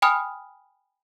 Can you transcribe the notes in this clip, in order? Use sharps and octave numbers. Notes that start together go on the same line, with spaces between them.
G5 G#5 B5 D#6 F6